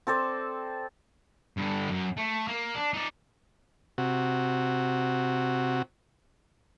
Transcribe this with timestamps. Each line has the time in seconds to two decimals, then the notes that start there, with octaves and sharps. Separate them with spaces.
0.07 C4 A4 C5 D5
1.57 G2 D3
1.89 F#2
2.17 A3
2.48 A#3
2.75 D4
2.93 D#4 D5
3.98 C3 F#4